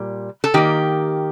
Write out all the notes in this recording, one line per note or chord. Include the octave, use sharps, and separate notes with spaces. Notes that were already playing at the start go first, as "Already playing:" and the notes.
Already playing: A#2 G3
A4
D#3 A#3 G4